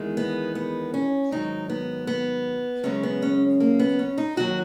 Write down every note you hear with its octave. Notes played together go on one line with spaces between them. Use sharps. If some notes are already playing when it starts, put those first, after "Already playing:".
Already playing: E2 D#3 G#3
B3
B3
C#4
G#2 D#3 F#3 D#4
B3
B3
F#2 C#3 G#3 C#4
B3
C#4
A#3
B3
C#4
D#4
D#2 D#3 F#3 F#4